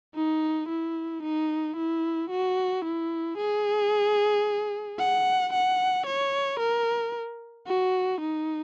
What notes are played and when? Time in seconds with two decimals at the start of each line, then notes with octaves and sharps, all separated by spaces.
0.15 D#4
0.68 E4
1.22 D#4
1.76 E4
2.30 F#4
2.84 E4
3.38 G#4
4.98 F#5
5.53 F#5
6.06 C#5
6.59 A#4
7.67 F#4
8.21 D#4